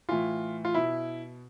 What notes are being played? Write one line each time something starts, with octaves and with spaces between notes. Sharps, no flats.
A2 E3 F4
F4
B2 E4